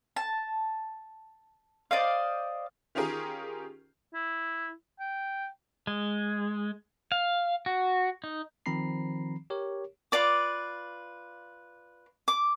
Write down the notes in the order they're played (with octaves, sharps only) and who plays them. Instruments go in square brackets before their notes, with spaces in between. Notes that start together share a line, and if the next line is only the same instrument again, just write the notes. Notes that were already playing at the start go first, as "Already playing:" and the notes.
[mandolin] A5
C5 D5 D#5 F5
[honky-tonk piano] D#3 C#4 F4 G4 G#4 A#4
[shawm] E4
G5
[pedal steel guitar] G#3
F5
F#4
D#4
[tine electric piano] D#3 F3 C4 A#5 B5 C7
G4 A#4 C#5
[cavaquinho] F4 B4 D5 D6
D6